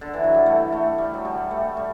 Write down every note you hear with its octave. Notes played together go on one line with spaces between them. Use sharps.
D3
E3
F#3
G3
A3
A3
G3
F#3
G3
A3
G3